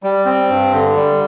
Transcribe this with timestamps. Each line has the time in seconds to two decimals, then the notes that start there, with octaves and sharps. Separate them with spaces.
0.03 G3
0.26 C4
0.49 G2
0.74 D3
0.96 G3